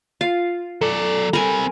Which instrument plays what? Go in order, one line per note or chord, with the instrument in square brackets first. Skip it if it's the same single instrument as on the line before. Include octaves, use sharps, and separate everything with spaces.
[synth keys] F4 [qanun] F5
[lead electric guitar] F#3 D5 [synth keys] A4
[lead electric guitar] G3 C4 [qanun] A#4 G#5